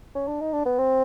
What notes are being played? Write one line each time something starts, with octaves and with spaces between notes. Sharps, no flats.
C#4
D4
D#4
D4
B3
C4